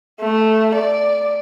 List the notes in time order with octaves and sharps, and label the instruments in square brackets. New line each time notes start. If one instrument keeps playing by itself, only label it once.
[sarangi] A3
D5